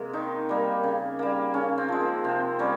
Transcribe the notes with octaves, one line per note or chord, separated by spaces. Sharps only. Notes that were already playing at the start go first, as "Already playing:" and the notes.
Already playing: C3 G#3 A#3
D#3 D#4
G3 A#3
C#3
G3 A#3
C#3 C#4
C4
F3 G#3
A#3
C3 C4
G3 A#3 C#4